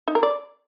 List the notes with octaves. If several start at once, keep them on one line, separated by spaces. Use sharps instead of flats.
D#4
A#4
D5